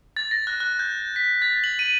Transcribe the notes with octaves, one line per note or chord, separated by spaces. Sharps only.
A6
A#6
F#6
F#6
G6
B6
A6
F#7
D#7